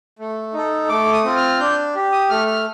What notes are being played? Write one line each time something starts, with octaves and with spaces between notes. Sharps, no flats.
A3
D#4 A4
A3 D6
D#6
C4 F4
F6
D4 G6
G4
D#6
A3 F6
F6